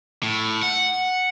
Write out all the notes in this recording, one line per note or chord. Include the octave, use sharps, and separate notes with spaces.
A2
F#5